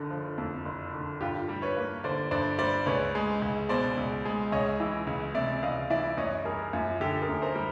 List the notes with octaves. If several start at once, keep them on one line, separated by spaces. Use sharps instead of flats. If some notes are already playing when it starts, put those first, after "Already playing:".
Already playing: F#1 D3
F3
F2
F#1
D3
G2 F4 G4
G3
B4 C#5
A#3
D3 C5 D5
G2 C5 D5
G3 C5 D5
C#2 B4 C#5
G#3
C#2
B2 C5 D5
C#2
G#3
C#2 C#5 D#5
E3
C#2
C3 D5 E5
C#2 D#5 F5
E3 D5 E5
F#2 C#5 D#5
G3 G#4 A#4
F#2 F4
D3 G4 A4
G#4 A#4
F#2
A#4 C5
G3